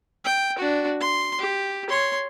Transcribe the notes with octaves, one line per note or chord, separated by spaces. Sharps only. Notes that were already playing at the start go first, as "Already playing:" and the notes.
G5
D4 F#4
C6
G4
C#5 C6